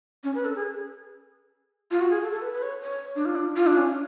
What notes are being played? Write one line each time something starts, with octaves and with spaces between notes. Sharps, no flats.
C#4
B4
A4
G#4
F4
F#4
G#4
A4
A4
B4
B4
C#5
C#5
D4
F4
D4
F4
D4
C#4